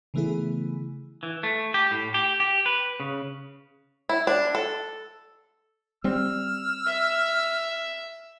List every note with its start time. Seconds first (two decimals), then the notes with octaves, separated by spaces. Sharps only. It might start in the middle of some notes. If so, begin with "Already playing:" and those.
0.14 C#3 E3 A3 B3 E4 G#4
1.23 E3
1.43 A3
1.74 G4
1.91 A2
2.14 G4
2.40 G4
2.66 B4
3.00 C#3
4.09 E4
4.27 D4
4.55 A4
6.04 G3 C4 E6 F6
6.87 E5